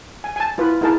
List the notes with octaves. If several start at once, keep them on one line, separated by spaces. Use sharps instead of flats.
G#5
G#5 A5
E4 F4 B4
D#4 E4 G#4 A#4 A5